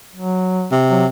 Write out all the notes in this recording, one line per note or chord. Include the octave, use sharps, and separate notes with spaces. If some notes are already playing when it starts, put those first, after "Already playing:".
F#3
C3
F#3